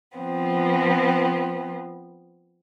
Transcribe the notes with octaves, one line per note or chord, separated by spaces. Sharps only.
F3 B3 C4